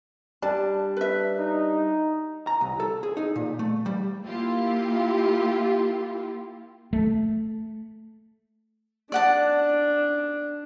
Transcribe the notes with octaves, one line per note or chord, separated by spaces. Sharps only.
G3 D4 A5
B4 E5
D#4
A#5
C2
A4
G#4
D#4
A#2
A3
G3
A#3 E4 F4 G4
A3
D4 D5 F#5 A5